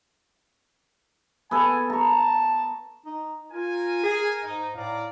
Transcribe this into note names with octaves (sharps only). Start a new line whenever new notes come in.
B3 A4 G#5
A5 A#5 C#6
D#4
F4 A#4 G#5
G#4
G#2 D#4
A2 D5 F5 A#5